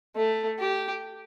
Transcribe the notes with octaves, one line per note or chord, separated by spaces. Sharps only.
A3
G4